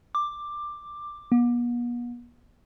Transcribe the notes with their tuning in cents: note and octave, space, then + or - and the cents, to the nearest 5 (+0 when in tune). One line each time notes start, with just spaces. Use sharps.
D6 +10
B3 -45